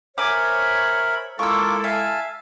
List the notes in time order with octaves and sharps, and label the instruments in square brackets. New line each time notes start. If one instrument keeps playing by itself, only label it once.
[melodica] A#4 E5 B5 [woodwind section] C5 C#5 [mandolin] G#5 D6
[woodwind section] G#3 E4 A4 [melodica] A#3 F4 D6 [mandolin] C#6 E6
[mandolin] E5 [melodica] F5 G#5 A5